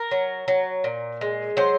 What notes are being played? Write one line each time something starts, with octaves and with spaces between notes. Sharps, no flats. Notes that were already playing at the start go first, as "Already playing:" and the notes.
Already playing: A#4
F#3
F#3
A#2
G#3
F#3 C5